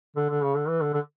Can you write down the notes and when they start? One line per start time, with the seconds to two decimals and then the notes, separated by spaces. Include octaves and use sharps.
0.16 D3
0.30 D3
0.43 C#3
0.55 D3
0.68 E3
0.81 D3
0.94 D3